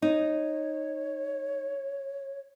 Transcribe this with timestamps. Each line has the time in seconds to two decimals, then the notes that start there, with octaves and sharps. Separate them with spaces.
0.02 D#4 C#5